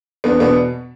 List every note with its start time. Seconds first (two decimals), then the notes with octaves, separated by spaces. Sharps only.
0.24 E2 B3 D4
0.40 B2 B3 D4